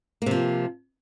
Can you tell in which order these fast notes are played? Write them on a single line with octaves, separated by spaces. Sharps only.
A#3 C3 F3